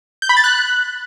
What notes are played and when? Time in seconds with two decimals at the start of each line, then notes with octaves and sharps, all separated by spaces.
0.22 G6
0.29 B5
0.37 A6
0.44 F#6